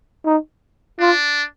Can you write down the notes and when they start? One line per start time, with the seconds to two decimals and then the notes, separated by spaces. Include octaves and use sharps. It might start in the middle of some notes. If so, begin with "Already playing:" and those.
0.26 D#4
1.00 D4 F4